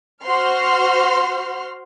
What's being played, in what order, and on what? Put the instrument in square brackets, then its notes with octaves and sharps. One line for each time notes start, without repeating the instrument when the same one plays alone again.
[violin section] F#4 C5 C6 F6